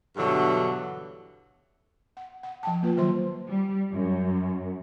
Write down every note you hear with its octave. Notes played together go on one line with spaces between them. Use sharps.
G2 B2 D3 E3 F#3
F#5
F#5
F3 G5 A5
A#3 F4 B4
D#3 F#3 C5 C6
G3
F#2